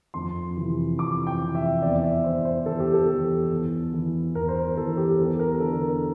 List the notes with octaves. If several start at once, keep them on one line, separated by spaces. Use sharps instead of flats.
F2 C6
C3 E3
F2 D6
G5
C3 E3
E5
E2 D5
E5
E3 C5
C5
E2 A4
G4
A4
E3
E2
E3
E2 A#4
C5
A#4
E3 A4
G4
E2 A4
A#4
D3 A4
A#4